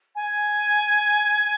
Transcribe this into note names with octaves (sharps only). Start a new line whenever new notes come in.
G#5